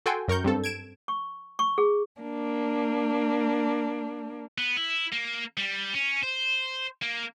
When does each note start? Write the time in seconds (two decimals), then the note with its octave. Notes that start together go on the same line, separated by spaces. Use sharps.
0.06 F#4 A4 G5 G#5 C6
0.28 F#2 A#4 C#6 G6
0.44 G2 C4 A4
0.64 G#6 D7 E7
1.08 C#6
1.59 C#6
1.78 G#4
2.20 A#3 D4
4.58 B3
4.77 E4
5.13 A#3
5.58 G3
5.95 C#4
6.23 C5
7.02 A#3